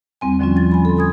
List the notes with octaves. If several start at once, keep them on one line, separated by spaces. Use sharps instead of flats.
E2 G3 C4 G#5
D3 F3 G3 C4 C#4 F4
F3 A6
G#5 B5
A4 C6
G#5 D#6 G#6